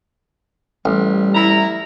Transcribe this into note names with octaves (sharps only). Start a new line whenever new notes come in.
A1 G3
E4 A#5